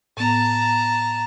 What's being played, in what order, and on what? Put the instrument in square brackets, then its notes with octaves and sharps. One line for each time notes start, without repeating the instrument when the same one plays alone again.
[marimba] A2 B3 [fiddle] A5 A#5